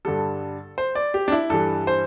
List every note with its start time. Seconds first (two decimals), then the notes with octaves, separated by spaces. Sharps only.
0.05 G2 D3 G3 A4
0.78 C5
0.95 D5
1.14 G4
1.28 D4
1.32 E4
1.50 G2 E3 G3 A4
1.87 C5